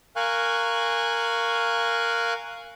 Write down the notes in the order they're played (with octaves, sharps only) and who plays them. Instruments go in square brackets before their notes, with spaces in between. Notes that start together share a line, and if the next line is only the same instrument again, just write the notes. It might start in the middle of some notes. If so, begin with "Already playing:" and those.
[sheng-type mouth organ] A#4 F5 G#5 C#6 F#6